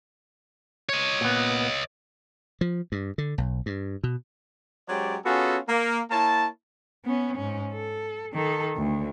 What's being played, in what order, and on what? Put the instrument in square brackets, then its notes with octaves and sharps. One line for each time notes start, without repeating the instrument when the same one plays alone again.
[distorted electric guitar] C#5 D#5
[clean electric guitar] A#2 B3
[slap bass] F3
G2
D3
B1
G2
B2
[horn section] F#3 G#3 C#4 G4 C5 D5
B3 C#4 F4 F#4 G#4 A4
A#3
A#3 E4 C#5 A5
[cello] B3 C#4
G#2 C#4
A4
D#3 A4
D2